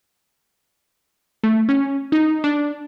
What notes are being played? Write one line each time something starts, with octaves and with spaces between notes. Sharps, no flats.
A3
C#4
D#4
D4